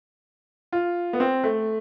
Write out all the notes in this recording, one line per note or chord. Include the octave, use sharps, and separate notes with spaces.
F4
B3
C4
A3